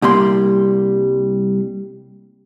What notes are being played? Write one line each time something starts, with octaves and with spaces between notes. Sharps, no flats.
C2 G3 A#3 C6